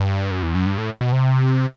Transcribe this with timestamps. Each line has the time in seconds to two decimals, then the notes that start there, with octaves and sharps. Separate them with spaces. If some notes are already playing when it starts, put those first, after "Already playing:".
Already playing: G2
0.31 F#2
0.43 E2
0.55 F#2
0.66 G2
0.78 A2
1.01 B2
1.12 C3